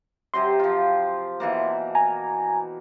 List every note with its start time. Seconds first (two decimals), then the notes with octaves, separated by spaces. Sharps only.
0.34 C3 F#3 G4 C6
0.60 F3 F4
1.40 B2 E3 A#3
1.95 G#5 A#5